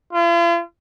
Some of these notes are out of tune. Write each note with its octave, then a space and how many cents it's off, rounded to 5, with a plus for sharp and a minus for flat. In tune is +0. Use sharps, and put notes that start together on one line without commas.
F4 -45